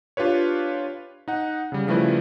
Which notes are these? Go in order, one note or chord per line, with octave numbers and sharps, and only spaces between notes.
D4 F4 G4 B4 C#5
D#4 F#5
C#3 G3
C#3 F3 G3 A3 E4 B4